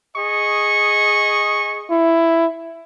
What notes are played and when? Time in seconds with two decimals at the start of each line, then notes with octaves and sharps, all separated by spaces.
0.16 G#4 D#5 C#6
1.90 E4